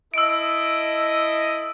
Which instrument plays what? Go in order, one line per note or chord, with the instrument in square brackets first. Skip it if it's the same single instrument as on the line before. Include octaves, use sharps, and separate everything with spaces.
[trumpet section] E4 A4 D#5 [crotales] E6 D7